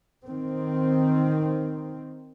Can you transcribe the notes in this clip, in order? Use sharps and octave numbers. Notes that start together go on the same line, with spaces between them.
D#3 C4